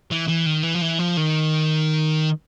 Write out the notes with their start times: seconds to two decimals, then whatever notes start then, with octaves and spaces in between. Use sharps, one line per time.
0.11 E3
0.28 E3
0.46 D#3
0.63 E3
0.75 F3
0.82 E3
0.99 F3
1.17 D#3